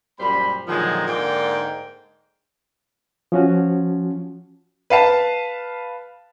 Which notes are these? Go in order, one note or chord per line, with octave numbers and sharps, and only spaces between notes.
F#2 A#2 G3 C5 B5
A#2 D3 D#3 F3 F#3 G#3
G#2 D3 A#3 D#4 D5 G5
F3 C#4 F#4
B4 F5 A5